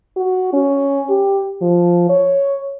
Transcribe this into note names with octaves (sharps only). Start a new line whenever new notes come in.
F#4
C#4
G4
F3
C#5